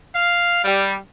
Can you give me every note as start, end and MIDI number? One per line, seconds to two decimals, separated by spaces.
0.14 0.63 77
0.64 0.95 55